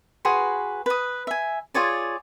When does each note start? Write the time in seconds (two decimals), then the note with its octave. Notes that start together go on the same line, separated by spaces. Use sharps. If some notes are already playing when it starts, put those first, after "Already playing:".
0.25 F#4 G#4 B4 C6
0.86 B4 D#6
1.27 E5 G#5
1.74 F4 G#4 C#5 D5